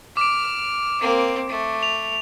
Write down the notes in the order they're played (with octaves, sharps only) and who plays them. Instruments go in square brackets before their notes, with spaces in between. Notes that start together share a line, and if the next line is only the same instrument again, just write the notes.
[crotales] D6 D7 [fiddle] F6
[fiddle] A#3 C4
A3
[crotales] F7